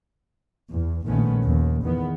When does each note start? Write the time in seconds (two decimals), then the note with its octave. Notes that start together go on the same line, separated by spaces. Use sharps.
0.70 E2
1.06 A#1 D#3 A3 B3 C#4
1.43 D#2
1.83 E2 D#3 B3